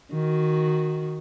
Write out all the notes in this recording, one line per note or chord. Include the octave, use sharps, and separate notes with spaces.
D#3 F#4